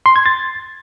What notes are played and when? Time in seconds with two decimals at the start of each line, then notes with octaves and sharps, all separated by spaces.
0.06 C6
0.16 G#6
0.26 A6